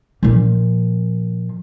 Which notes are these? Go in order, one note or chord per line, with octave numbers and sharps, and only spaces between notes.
A#2 F3